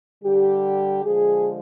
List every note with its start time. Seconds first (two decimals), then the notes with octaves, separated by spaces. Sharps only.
0.24 D3 G3 G4
1.04 D3 F3 G#3 G#4